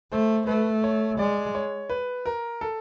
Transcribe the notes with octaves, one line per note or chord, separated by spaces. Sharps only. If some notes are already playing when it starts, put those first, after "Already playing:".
A3 C5
A3 B4
C#5
G#3 D5
C#5
B4
A#4
A4